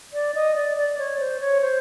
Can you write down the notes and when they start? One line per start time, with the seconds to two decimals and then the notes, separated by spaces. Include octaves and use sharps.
0.13 D5
0.35 D#5
0.55 D5
0.77 D5
0.98 C#5
1.19 C5
1.40 C#5
1.61 C5